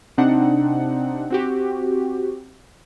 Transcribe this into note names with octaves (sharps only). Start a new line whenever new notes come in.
C3 C4 D4 D#4 F#5
C4 F#4 G4